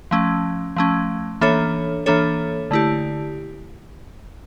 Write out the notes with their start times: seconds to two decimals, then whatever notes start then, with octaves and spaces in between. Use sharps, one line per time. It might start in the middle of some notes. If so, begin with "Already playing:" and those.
0.11 F3 A3 C#4
0.76 F3 A3 C#4
1.41 E3 A#3 D4 A4 C#5
2.06 E3 A#3 D4 A4 C#5
2.71 D3 A3 E4 G4